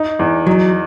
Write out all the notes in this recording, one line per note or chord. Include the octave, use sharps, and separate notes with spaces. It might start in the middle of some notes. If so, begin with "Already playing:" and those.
Already playing: D#4
E2
F#3 D#4